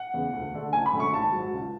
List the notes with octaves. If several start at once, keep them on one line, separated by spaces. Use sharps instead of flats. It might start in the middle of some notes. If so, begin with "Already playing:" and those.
Already playing: F#5
E2 C#3
D2
D3 A3 D4
F#1 G#5
B5
F#2 D3 A3
C#6
G#1 A5
G#2 F#3
C#2